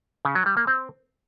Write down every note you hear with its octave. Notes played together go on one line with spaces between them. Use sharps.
C#3
F#3
G3
A#3
C4